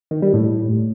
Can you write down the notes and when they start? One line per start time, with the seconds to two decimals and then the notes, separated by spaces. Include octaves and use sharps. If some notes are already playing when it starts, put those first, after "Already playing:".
0.11 D#3
0.22 G3
0.34 A2